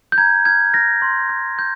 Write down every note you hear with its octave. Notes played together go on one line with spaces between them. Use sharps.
G6
A#5 G#6
F6 G#6
F6 A#6
C6
G6
G6